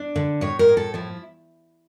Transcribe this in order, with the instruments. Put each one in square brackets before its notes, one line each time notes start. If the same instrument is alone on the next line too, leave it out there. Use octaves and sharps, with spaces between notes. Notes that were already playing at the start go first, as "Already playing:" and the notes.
Already playing: [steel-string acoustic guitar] D4
D3
A2 C#5
A#4
A2
A4
F3 E4